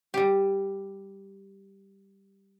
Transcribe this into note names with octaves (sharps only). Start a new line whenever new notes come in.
G3 G4